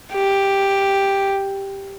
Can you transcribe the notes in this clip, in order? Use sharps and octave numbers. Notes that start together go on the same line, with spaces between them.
G4